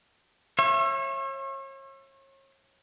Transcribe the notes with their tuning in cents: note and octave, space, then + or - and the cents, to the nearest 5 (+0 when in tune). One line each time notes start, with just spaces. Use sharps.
C#5 -35 E5 +25